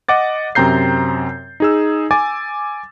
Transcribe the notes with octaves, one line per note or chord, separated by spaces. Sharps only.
D#5 F#5 D6 A6
F#2 C3 C4 A#5 G6 C7
D#4 G#4 E6
G#5 D6 A6